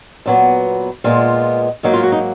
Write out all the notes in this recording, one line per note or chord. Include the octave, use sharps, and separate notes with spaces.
A#2 F#3 B3
A#2 G#3 B3 F4
G#2 F#3 A#3 D#4
F4
F#4
D#4